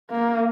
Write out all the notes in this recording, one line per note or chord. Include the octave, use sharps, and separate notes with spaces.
A#3